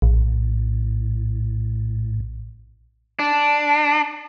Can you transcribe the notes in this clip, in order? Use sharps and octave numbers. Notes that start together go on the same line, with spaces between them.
A#1 A2
D4